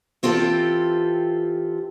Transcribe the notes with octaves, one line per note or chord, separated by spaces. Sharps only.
E3 C4 F4 G4 A4